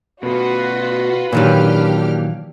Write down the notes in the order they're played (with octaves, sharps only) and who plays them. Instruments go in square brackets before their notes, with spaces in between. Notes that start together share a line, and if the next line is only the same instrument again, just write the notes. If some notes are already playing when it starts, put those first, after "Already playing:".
[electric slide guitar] B2 A3 [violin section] F4 F#4 [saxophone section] B4
[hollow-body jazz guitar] A#2 D#3 F#3 [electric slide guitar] E3 A#3 [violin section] D4 G4 F6